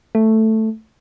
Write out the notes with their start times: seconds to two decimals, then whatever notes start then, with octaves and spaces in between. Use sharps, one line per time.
0.15 A3